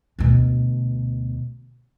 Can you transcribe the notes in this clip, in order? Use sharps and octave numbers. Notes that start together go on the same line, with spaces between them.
D2 B2